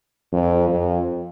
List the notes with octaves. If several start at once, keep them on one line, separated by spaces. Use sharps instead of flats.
F2
F2